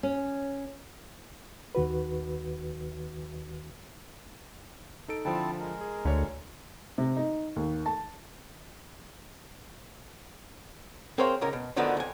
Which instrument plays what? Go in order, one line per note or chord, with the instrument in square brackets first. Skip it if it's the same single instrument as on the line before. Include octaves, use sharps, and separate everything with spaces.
[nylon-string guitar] C#4
[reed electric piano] D#2 D#3 F#4 B4
[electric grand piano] D#4 A4 D7
[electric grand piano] D3 F3 [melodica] C4 E4 A5
[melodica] G#3 A#4
[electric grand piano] G#4
[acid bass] D2 [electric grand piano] D3 C#5
[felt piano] C3
D#4
D#2
A5
[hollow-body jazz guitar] C4 G#4 A#4 C5 C#5 F5
C#2 G#2 C#4 A#4
B2
D3 D#3 F3 F#3 A3 B3
F2 G#5